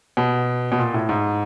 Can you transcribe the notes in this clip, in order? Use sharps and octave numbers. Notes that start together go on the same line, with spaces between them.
B2
B2
A#2
A2
G#2